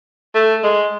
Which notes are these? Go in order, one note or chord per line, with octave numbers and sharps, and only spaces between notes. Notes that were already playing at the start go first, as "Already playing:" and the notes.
A3
G#3